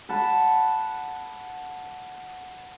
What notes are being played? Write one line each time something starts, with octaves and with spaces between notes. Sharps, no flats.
F#5 A5 B5